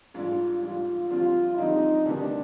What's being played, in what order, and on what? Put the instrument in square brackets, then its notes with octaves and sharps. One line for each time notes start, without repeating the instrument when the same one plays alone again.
[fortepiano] G#2 G3 D4 G4 [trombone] F4
[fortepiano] G#2 G3 D4 G4 [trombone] F4
[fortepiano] F2 D3 G3 C4 [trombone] F4
[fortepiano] F2 D3 G3 C4 [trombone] D#4
[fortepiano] D2 C3 D#3 G3 B3 [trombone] D4